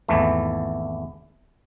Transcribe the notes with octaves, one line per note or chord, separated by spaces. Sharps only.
G#1 E2 E3 A3